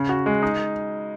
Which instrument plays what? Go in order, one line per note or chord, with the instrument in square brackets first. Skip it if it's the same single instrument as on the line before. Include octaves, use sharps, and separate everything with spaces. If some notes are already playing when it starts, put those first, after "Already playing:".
Already playing: [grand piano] C#3
F#4
G#3
D#4